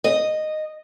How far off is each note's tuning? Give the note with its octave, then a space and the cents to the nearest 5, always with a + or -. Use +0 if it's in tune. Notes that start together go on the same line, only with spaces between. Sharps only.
D#5 -10